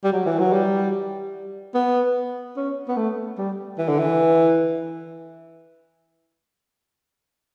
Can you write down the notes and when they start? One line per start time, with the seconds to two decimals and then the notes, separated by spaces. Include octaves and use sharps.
0.04 G3
0.13 F#3
0.25 E3
0.39 F#3
0.53 G3
1.74 B3
2.56 C#4
2.88 B3
2.96 A3
3.38 G3
3.78 E3
3.89 D3
3.99 E3